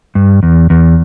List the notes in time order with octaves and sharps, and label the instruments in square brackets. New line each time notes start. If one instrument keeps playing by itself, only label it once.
[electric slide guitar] G2
E2
E2